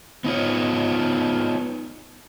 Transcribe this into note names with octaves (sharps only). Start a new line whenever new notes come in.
B3 D#4 F4 C#5